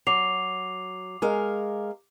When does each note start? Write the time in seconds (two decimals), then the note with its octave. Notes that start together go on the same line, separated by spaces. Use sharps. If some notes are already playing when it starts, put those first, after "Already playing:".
0.07 F#3 D6 C7 F7
1.22 G#3 A#4 F5